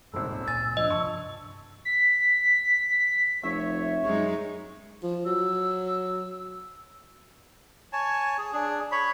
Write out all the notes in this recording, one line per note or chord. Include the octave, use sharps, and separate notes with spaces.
D#1 G#1 G2 C#3 E6
C#2 A#2 G#5 A6
F3 D4 D#5
G2 C3 F3 A5 C#6
B6
F1 C#5 E5
F#2 G#3 D#4 C#5
F3
F#3 E6
C#5 G#5 A5
G#4
D4 G#4
C#5 B5